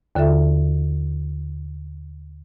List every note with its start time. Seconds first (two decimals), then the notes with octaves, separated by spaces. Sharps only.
0.15 D#2 D3 F4 A4 E5